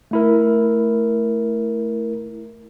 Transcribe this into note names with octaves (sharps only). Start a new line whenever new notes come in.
A3 E4 A#4